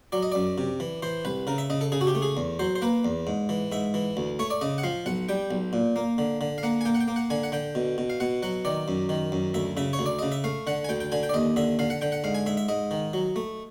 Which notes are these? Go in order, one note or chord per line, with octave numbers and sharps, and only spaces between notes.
F#3 D5
D#5
F#2 D5
C3
E3
E3 C5
C2 B4
C#3 A#4
E5
C#3 D#5
A4
C#3 G#4
F#4
G4
A3
G#4
E2
F#3 C5
C5
A#3 B4
E2
G#2
E3
G#2 E5
E3
D2
A3 C#5
D5
C#3 D#5
F#5
F3 F5
B1 F#5
G3 G5
B1
A#2
A#3
D3
D3
F5
A#3 F#5
G#5
A#3 G5
F#5
G5
A#3
F#5
D3 G#5
F#5
D3 G5
B2
B2
F5
B2 F#5
F#3 F#5
D#3 D5
F#2
D#3
F#2
D2 E5
C#3 E5
C#5
D2
D5
C#3 D#5
E5
A3 F5
D3 F#5
G#5
D2 G5
G5
D3 G#5
G5
D5
D#2 D#5
D3 E5
D3 F5
F#5
D3 G5
F#5
G#2 F5
G#5
G#2 E5
E5
G#2 D#5
D#3
F#3
A3